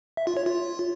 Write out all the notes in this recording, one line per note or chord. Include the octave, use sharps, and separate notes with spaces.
E5
F4
C#5
F4